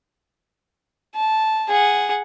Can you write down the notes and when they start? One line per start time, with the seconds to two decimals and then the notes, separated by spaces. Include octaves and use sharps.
1.15 A5
1.69 G#4 F#5